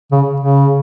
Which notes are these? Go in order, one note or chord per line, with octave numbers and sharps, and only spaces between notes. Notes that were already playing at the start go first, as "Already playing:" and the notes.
C#3
C#3